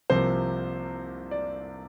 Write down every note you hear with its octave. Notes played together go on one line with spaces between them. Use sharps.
C2 C3 F3 A#3 C5
D5